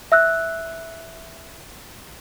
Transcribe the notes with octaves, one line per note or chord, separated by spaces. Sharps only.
E5 E6 F#6